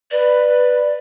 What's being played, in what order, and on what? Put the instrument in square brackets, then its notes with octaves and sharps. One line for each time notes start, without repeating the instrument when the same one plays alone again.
[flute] B4 [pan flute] D5